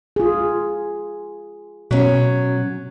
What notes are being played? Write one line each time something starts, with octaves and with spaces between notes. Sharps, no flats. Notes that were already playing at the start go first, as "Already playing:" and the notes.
F4 G#4
B2 F#3 C#4